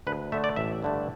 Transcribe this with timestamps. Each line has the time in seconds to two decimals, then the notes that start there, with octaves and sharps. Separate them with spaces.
0.07 D2 B4
0.32 D3 A3 E5
0.44 D5
0.56 A1 E5
0.83 G2 D3 A3